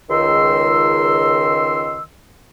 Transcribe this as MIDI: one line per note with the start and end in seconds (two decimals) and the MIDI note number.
0.10 2.02 37
0.10 2.02 51
0.10 2.02 84
0.10 2.02 88